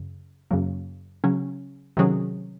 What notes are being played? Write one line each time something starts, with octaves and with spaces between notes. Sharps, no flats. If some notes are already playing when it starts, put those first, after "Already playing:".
Already playing: F#2 C#3
F#2 C#3 F#3 A#3
C#3 F#3 C#4
C3 D#3 F#3 C#4 G#4